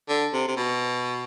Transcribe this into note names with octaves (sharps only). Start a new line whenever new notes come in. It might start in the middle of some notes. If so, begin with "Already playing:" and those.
D3
C3
C3
B2